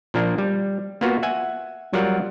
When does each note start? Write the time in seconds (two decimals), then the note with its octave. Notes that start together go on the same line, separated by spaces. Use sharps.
0.14 A#2 F3 A#3 D4
0.38 G3
1.01 A#3 B3 F4 F#4
1.23 E5 F#5 G#5
1.93 F#3 G3 F4 A#4 F#5